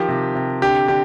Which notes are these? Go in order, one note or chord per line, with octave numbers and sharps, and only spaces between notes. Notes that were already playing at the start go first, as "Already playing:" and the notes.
Already playing: D#3 F3 G4
C3
C3
D3 G4
D3 G4